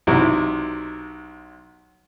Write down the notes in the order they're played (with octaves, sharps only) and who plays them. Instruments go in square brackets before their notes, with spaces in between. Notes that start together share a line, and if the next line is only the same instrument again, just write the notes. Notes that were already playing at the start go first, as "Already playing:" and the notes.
[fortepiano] B1 C3 E4